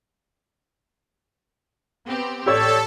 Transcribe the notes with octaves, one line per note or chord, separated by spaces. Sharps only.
B3 C4 G4
A1 G4 A4 C#5 D5 E6